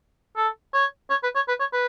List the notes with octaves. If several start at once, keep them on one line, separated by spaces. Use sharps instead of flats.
A4
C#5
C#5
B4
C#5
B4
C#5
B4